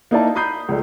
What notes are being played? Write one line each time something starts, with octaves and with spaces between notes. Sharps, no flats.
A#3 D#4 E4 D5 A5
A#5 B5 D#6 G6 C7
C#2 G#3 A3 D5